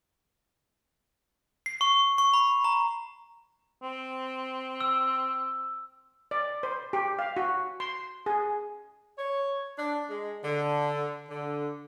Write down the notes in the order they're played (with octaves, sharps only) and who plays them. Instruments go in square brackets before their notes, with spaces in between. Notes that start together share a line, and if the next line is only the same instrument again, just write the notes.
[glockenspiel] C7
C#6
C#6
B5
A#5
[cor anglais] C4
[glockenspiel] E6
[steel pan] D5
C5
G4
F5
F#4
C6
G#4
[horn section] C#5
D4
G#3
D3
D3